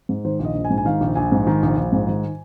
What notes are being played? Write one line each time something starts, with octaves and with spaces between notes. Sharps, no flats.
G#2
D#3 C5
A#1
D#5
A#1
G#5
G#2
G#5
D#3 F5
A#1
A#1 G#5
G#2
D#3
A#1
A#1
G#2
D#3